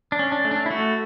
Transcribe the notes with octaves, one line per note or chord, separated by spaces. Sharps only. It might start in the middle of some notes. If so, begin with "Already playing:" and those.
D4
C#4
D4
A3
D4
E4
A3 F#4